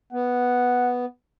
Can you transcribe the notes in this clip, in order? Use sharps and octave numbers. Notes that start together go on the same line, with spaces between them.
B3 F#5